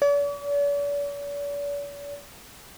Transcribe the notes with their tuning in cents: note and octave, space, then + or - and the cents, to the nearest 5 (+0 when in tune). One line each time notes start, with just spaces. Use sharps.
D5 -45